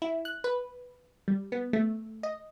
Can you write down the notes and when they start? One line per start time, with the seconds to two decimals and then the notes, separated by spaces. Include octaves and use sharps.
0.02 E4
0.25 F#6
0.44 B4
1.28 G3
1.52 B3
1.73 A3
2.23 D#5